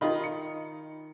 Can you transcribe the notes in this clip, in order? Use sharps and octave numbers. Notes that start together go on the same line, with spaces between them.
D#3 F4 D#5 B5
C#7